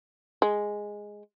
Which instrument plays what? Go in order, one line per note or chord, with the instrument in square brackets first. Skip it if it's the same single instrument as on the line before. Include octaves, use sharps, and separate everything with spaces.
[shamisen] G#3